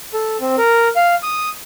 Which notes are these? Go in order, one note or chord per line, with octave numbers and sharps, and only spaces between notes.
A4
C4
A#4
F5
D#6